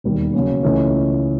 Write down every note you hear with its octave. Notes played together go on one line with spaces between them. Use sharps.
E1 D#2 D#3 G3
C#3 F#3 A#3 C#4
C#2 C#3 E3 A3 C#4